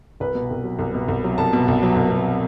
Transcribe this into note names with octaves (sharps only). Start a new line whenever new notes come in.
C2 B4
B2
C2
F#3
C2
B2
C2
F#3
C2 A5
B2
C2
F#3
C2
B2